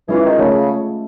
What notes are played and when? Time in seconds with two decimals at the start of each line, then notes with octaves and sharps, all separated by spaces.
0.08 E3 G#3 C#4 F4
0.24 D#3
0.38 C#3 A3